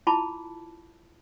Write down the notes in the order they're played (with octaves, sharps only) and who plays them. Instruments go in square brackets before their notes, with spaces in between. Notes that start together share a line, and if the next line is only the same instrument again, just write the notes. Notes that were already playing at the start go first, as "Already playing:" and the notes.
[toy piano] E4 F4 A5 B5 D6